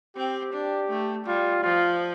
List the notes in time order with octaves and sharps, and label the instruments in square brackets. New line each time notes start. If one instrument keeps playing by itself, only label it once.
[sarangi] C4 [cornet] G4
[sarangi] D4
A3
[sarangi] G3 [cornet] F4
[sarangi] F3 [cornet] F4